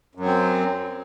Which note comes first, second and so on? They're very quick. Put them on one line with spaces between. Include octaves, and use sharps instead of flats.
F#2 F#3 C4